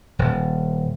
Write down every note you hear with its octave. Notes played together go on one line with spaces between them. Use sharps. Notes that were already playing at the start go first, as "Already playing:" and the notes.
D#1